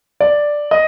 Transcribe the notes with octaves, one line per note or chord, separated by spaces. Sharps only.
D5
D#5